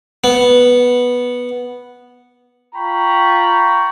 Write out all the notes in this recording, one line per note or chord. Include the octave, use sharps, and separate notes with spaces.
B3
F4 G5 A#5 B5 C#6